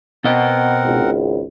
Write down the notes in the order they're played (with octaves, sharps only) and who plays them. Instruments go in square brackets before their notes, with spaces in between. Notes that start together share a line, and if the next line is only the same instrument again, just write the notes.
[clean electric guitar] B2 D#5 [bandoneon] C4 A#4 F#5
[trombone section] G#1 C#2